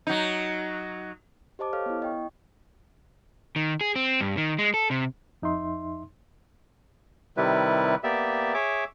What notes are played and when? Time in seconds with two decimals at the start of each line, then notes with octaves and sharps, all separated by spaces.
0.07 F#3 D#4
1.59 G4 C5 D#5 A5 D6
1.73 A4 C#5 F5 F6
1.86 B3 E4
2.02 D#5 G5 C#6
3.56 D#3
3.81 G#4
3.96 C4
4.21 G2
4.37 D#3
4.59 G#3
4.74 A4
4.91 C3
5.42 F2 D#4 E5 C6
7.37 C3 D#3 G3 E4 B4
8.03 A#3 B3 G4 D5 E5
8.54 G#4 C#5 E5 D6